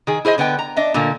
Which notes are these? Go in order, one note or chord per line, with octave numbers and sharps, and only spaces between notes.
D#3 G#4
E4 G#4 C5 D#5
D3 B3 B4 G5
A#5
D4 D#5 E5
A#2 D3 A3 A#3